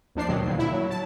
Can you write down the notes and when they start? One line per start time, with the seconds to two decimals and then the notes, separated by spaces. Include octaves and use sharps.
0.15 D#2 F3 D4 C7
0.29 B2 D#3 F#3
0.46 D#2 A#2 D3
0.59 E4
0.72 F#3
0.91 A5